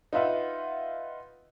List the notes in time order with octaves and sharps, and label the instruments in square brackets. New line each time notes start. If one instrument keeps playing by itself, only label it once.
[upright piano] D#4 F4 B4 E5 F#5